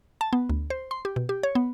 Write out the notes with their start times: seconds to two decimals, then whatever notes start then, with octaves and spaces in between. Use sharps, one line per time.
0.21 A5
0.33 B3
0.50 D2
0.70 C5
0.91 C6
1.05 G4
1.16 B2
1.29 G4
1.43 C#5
1.55 B3